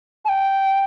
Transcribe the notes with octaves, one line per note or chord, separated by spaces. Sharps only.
A5
G5